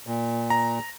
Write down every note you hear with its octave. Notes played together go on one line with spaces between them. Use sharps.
A#2
A#5